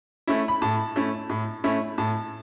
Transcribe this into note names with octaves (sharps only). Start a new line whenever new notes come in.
A3 C#4 E4
B5
A2 A5
A3 C#4 E4
A2
A3 C#4 E4
A2 A5